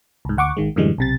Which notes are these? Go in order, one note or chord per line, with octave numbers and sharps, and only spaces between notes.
C2 G#2
D2 F#5 C#6 D6
G#1 D#3 G#3
F#2 A2 D3 E3 G3 G#3
B1 C3 A6